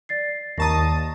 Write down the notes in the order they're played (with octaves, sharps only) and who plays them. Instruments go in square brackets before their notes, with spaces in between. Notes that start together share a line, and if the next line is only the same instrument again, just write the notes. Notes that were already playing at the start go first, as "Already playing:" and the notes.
[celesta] D5 A6 C7
[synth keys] D#2 A5 D#6 [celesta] A#5 C#6 A#6